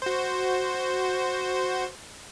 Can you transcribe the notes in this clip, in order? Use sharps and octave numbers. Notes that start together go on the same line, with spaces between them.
F#4 C5